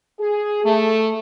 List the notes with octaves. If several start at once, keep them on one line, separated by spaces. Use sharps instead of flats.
G#4
A3